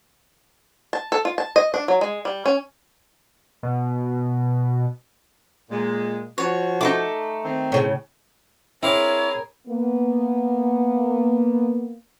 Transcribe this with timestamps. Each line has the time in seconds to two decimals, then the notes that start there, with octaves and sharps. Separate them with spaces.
0.93 A5
1.12 A4
1.25 F4
1.38 A5
1.56 D#5
1.74 D4
1.88 F#3
2.01 G#3
2.25 G3
2.46 C#4
3.63 B2
5.70 A#2 G#3
6.38 F3 F#4 C#5
6.81 A3 D#4 F4 D6
7.44 D#3 C4
7.72 A2 C#3
8.83 C4 E4 G#4 A#4 C#5 F5 D6
9.68 A#3 B3